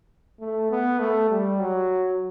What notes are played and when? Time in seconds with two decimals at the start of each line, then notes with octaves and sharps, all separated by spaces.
0.40 A3
0.71 B3
0.99 A3
1.30 G3
1.60 F#3